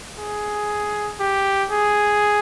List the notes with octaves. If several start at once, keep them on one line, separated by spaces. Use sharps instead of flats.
G#4
G4
G#4